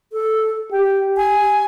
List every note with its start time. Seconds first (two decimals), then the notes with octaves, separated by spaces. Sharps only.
0.12 A4
0.72 G4 G5
1.17 G#5